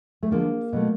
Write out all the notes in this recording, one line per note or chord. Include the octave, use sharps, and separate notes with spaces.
A3
D3 F3 G#3 A#3
B2 F#3 A3